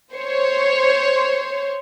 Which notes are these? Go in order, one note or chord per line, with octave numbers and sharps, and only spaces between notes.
C5 C#5